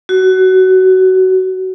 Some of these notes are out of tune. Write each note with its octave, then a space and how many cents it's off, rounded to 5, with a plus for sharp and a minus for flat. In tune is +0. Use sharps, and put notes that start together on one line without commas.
F#4 +20